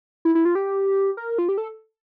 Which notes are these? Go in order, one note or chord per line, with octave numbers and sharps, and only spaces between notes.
E4
E4
F4
G4
A#4
F4
G4
A4